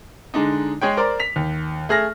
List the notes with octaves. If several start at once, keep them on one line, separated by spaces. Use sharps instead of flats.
D3 G#3 D4 D#4
G#3 G#4 C#5 G5
A#4 C5 D5
B6 F7
D#2
A3 G#4 F6 A#6